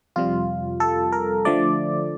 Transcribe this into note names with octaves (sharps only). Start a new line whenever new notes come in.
F2 C3 G3 F4
A4
A#4
D3 F3 A3 D5